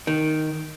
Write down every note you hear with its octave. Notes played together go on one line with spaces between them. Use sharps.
D#3